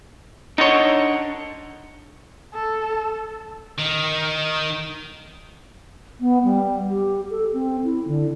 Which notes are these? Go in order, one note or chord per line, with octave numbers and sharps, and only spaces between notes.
D4 D#4 C#5 F#5 C6
A4
D#3
B3
G3
G4
A4
C4
E4
D3